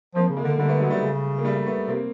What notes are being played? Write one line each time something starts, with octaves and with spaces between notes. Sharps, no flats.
F3 A#3 C4
C#3
G#3 A#3
D3
A#3
D3 G3 A3
A3 B3
F#3 G#3
G3 A3
C#3
A#3
G3 A3
A3 B3
C3 A#3 C4